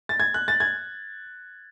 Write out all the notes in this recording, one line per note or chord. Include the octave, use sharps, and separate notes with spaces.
A6
G#6
F#6
A6
G#6